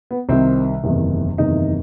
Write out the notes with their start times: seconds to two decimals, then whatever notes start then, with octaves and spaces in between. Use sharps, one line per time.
0.11 B3
0.29 C2 C3 D#3 C4
0.83 F#1 E2 C3 D#3
1.38 F#1 E2 C3 D#3 D#4